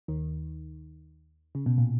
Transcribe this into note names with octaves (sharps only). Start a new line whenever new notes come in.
D#2 D#3
C#3
B2
A#2